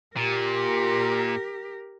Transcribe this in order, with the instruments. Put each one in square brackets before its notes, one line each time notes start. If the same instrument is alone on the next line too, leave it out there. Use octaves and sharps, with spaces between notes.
[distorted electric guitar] A#2 [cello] G4 A#4